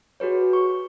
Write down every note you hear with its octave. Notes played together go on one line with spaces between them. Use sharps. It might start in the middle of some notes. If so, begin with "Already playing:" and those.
F#4 G#4 B4 C#5
C#6